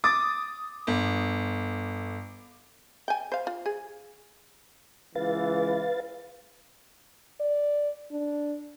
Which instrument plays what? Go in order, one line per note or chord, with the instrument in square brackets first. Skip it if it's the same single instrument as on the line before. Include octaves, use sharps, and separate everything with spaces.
[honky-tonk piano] D6 D#6 A6
G1
[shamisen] G5 G#5
C5 F5
F4
G#4
[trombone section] C#2 E3 [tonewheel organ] B4 F5 A6
[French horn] D5
D4